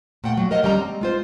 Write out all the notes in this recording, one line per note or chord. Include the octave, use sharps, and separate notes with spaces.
A#2 A3 F#5 G5
A#2 F#3
D#3 A#4 C5 D#5 F5 F#5
F2 G3 C#4 D#5 A#5
G#3 C4
G#3 F4 C5